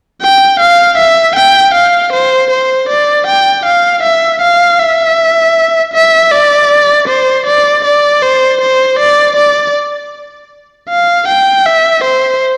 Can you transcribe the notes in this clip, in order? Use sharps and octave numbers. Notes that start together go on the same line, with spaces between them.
G5
F5
E5
G5
F5
C5
C5
D5
G5
F5
E5
F5
E5
E5
D5
C5
D5
D5
C5
C5
D5
D5
F5
G5
E5
C5